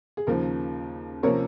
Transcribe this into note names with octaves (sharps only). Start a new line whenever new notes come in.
G#4
D#2 C#3 F3 A#4
C3 F3 A#3 C#4 A#4 C#5